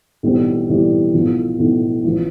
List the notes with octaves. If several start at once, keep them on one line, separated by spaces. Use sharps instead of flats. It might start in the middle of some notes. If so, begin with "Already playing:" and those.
B1 A2 E3 G3 C4
B1 A2 E3 G3 C4
B1 A2 F3
B1 A2 F3
A1 F3